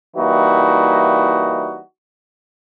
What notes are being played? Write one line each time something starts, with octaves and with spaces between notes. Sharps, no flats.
E3 G3 A#3 D#4 E4 F#4